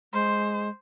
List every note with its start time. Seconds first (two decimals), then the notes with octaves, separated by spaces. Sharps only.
0.13 G#3 C5